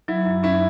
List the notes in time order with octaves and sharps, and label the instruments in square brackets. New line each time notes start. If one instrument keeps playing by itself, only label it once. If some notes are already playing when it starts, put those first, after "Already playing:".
[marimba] F#3 [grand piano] E4
[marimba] F#2
[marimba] C#4 [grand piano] E4